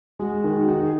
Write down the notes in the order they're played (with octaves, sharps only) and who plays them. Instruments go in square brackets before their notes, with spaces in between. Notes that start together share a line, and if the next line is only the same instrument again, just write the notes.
[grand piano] G#3 [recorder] F#4
[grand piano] D#3
[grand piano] D#4 [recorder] F#4
[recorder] G#4